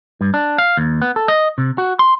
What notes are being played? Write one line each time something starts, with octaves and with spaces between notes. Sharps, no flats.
G2
D4
F5
D#2
B3
A4
D#5
C3
F#4
C6